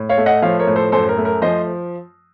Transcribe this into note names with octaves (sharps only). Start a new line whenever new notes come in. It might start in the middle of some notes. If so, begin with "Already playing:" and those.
Already playing: A2
C#5 F5
A3
D#5 F#5
F3 C#5 F5
A#4 C#5
A2
A4 C5
F#2 A4 C5
A#4
A3
A#4
F3 C5 D#5